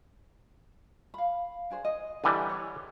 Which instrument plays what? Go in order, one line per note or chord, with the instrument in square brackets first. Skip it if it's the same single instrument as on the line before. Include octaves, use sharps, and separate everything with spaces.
[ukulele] F5 B5
D4 G#4 C5
D#5
[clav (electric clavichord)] D3 E3 G3 [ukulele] G#5 A#5
[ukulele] C#5